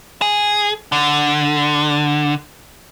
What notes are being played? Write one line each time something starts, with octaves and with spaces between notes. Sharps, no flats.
G#4
D3